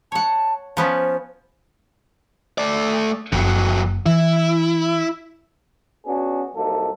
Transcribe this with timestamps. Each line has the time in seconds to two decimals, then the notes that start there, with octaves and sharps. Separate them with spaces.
0.12 C#5 F#5 A5
0.77 F3 B3 C#4 C5
2.58 A3 D5
3.32 F#1 F2 F#3
4.06 E3 E4
6.06 B3 C#4 D4 F#4 G#4
6.55 C2 F#3 A#3 D#4 A4